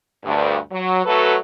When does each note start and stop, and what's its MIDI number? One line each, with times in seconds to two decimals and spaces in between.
0.24 0.58 38
0.24 0.58 43
0.72 1.03 54
1.05 1.37 54
1.05 1.37 57
1.05 1.37 66
1.05 1.37 69
1.05 1.37 71